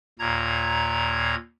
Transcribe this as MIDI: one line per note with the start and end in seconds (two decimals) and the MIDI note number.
0.19 1.35 39
0.19 1.35 46
0.19 1.35 82
0.19 1.35 92